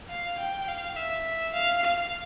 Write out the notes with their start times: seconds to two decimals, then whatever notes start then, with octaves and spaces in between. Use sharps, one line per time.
0.10 F5
0.40 G5
0.68 F5
0.96 E5
1.54 F5
1.83 F5